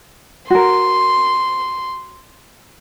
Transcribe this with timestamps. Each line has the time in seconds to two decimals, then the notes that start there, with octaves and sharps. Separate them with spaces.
0.50 F#4 A#4 C6